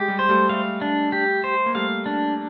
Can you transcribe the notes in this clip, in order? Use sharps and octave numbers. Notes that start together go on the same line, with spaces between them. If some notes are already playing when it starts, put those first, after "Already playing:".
Already playing: G#3 G4
G3
C5
G3 A3
G3 A3 F5
D4
G4
C5
A#3
G3 A3 F5
D4